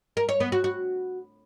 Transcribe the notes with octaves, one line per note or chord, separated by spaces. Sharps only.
A#4
C#5
B3
F#4
F#4